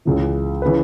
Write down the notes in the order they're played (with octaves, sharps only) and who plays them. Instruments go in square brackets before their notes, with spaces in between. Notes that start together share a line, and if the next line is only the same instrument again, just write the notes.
[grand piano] C#2 C#3 E3
C#3 E3 B4